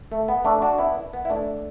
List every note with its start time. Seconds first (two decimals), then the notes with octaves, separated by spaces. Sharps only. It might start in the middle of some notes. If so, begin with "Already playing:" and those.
0.12 A3
0.28 B3
0.45 A3 D4
0.62 D4 F#4
0.78 B3 E4
1.13 B3
1.25 E4
1.30 A3 D4